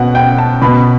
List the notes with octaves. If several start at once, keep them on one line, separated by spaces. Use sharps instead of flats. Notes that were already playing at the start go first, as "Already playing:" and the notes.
Already playing: B2 F#5
G5
A5
B2 B5